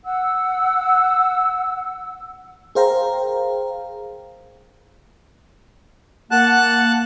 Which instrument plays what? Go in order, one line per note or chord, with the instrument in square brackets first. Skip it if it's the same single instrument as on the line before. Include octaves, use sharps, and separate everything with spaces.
[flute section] F#5 E6
[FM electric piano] G#4 A#4 C5 F5 G5 A#5
[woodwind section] A#3 F#5 [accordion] A5 F#6